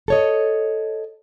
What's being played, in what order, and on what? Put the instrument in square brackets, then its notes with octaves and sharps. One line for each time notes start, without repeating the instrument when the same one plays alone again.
[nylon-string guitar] A4 C#5 D#5